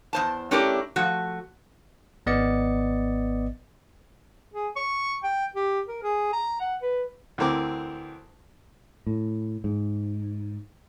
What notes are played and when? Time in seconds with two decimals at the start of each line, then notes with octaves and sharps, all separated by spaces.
0.13 E2 C5 A5
0.51 A3 C#4 D4 E4 G4 A#4
0.96 F3 A3 F#4
2.26 G#1 B3 D5 D#5 A6 C#7
4.54 G#4
4.76 C#6
5.24 G5
5.56 G4
5.88 A#4
6.03 G#4
6.33 A#5
6.61 F#5
6.82 B4
7.38 D2 E3 C4 A#4 D6
9.07 A2
9.64 G#2